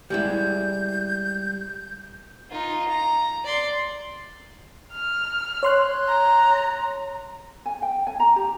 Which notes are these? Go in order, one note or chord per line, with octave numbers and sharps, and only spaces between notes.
G3 G#3 E4 G6
D#4 F4
A#5
D5 C6
F6
C#5 C6 F#6
A#5
G#5
G5
G#5
A#5
G4